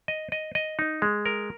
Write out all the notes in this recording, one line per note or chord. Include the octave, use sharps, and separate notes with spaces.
D#5
D#5
D#5
D#4
G#3
A#4